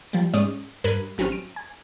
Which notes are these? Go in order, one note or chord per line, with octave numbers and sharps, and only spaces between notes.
F3 G3 D7
G#2 G#3 C#4 D5 D#6
G2 A#4 B5 F#6 G#6 D#7
A1 F#3 G3 C4 C#4 F6
D7
G#5